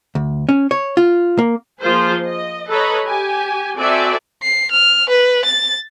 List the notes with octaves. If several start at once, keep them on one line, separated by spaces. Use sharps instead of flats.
D2
C#4
C#5
F4
A#3
F3 A#3 F4 G#4 C5
D#5
A4 B4 C#5 D#5 A#5 B5
G4 G#5
C4 F#4 A4 D5 E5 G#5
C7
F6
B4
A6